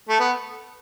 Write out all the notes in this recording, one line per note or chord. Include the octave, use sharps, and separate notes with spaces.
A3
B3